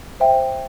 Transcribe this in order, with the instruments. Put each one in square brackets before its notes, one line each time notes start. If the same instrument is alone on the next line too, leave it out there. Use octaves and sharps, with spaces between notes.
[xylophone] C5 E5 G5